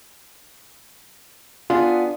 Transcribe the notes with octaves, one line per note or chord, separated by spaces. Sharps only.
B3 D4 F4 G#4